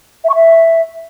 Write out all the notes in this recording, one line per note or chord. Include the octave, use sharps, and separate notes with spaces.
E5
C#6
E5